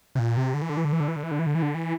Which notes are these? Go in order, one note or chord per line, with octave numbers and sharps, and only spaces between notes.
C3
A#2
C3
D3
E3
D3
E3
D3
E3
D3
E3
D3
E3
D3
E3
D3
E3
D3
E3